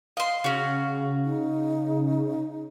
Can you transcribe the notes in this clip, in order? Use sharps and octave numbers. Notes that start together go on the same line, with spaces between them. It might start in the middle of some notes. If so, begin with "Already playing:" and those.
D#5 F5 C6
C#3 C#4 F#4
D#4